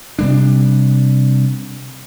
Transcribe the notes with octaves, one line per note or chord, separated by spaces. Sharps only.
C3 G3 D4